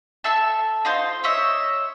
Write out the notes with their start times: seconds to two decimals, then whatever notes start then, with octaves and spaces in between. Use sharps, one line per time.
0.24 A4 E5 A5
0.85 D#4 F4 C5
1.24 C#5 D#5 E5